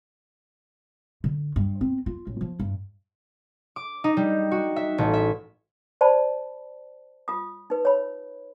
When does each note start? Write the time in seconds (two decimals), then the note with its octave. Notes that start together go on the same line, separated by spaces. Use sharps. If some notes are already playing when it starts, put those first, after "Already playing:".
1.24 D3
1.56 G2
1.81 C4
2.06 F4
2.27 A1
2.41 F3
2.60 G2
3.76 D6
4.04 D#4
4.17 G3
4.51 F#4
4.76 E5
4.98 A1
5.14 E5
6.01 C5 D5 A5 B5
7.28 F4 D#6
7.70 D#4 B4
7.85 C#5 B5